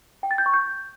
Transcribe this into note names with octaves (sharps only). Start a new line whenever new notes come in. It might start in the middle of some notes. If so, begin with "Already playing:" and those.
G5
A6
G6
C#6
G6